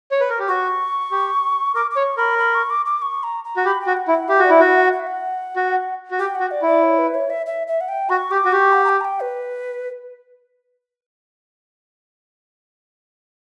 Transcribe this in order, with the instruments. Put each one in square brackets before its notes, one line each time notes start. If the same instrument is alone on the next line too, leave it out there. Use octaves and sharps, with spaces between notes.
[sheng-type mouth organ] C#5
B4
A#4
G4
[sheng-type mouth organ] F#4 [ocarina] C#6
[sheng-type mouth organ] G4
[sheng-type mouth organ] A#4 [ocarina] D6
[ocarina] D6
[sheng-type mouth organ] C#5 [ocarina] C#6
[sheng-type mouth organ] A#4 [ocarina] B5
[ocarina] B5
C#6
D6
D6
C#6
A#5
A#5
[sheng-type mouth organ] F#4
[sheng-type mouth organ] G4 [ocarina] B5
[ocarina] G5
[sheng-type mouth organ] F#4
[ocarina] F#5
[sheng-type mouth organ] E4
[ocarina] F#5
[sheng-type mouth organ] G4 [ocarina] E5
[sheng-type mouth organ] F#4
[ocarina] D5
[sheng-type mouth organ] E4
[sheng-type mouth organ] F#4 [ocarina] F#5
[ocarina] F#5
F#5
E5
F#5
[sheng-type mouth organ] F#4
F#4
[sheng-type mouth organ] G4 [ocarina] G5
[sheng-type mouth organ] F#4 [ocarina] F#5
[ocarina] D5
[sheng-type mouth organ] E4 [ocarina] D5
[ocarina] C#5
B4
C#5
E5
E5
E5
F#5
G5
[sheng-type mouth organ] F#4 [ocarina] C#6
[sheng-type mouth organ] G4 [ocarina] D6
[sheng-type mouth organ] F#4
[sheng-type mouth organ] G4 [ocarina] C#6
[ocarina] F#5
A#5
G5
A#5
G5
B4